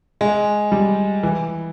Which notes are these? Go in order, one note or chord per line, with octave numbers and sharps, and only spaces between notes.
G#3
G3
E3